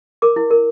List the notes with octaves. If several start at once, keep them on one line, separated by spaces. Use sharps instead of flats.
A#4 D6
E4
A#4